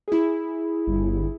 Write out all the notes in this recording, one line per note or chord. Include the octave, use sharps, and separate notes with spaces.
E4 G#4
G1